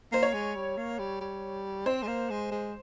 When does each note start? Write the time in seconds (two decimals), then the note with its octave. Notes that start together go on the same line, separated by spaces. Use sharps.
0.12 A#3 C5
0.23 C#5
0.33 G#3
0.56 G3
0.77 A#3
0.99 G3
1.21 G3
1.86 C4 C5
2.02 G#3
2.07 A#3
2.30 G#3
2.51 G#3